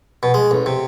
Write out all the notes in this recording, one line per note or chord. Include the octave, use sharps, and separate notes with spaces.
B2
G#3
A1
C3